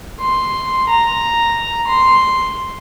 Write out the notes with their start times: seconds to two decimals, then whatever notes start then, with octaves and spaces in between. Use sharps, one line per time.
0.20 C6
0.90 A#5
1.87 C6